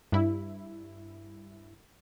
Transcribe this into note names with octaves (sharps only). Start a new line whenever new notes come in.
G2 E4